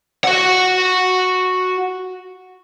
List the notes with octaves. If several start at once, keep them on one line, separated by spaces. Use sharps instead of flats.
F#4 F#5